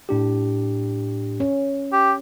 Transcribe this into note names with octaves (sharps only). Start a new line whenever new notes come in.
A2 D4 G4
C#4
G4